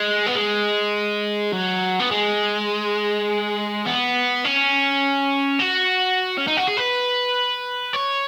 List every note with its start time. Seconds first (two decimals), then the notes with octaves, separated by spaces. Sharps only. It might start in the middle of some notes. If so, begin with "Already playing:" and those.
Already playing: G#3
0.27 B3
0.35 G#3
1.52 F#3
1.99 B3
2.11 G#3
3.86 B3
4.44 C#4
5.60 F#4
6.38 C#4
6.47 D#4
6.57 F#4
6.67 G#4
6.77 B4
7.93 C#5